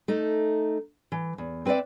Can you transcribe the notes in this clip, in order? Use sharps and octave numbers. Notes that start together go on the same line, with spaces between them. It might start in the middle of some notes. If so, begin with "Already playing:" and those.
A3 D#4
E3
E2
C4 B4 C#5 D5 E5